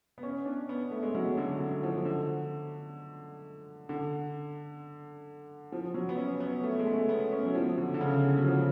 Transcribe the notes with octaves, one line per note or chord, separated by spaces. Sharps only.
B3
C#4
D4
B3
A3
G#3
F#3
D3
D3
F3
D3
D3
F3
F#3
B3
C#4
B3
A3
G#3
A3
B3
C#4
F#3
F3
D3
D3
C#3
D3
F#3
F3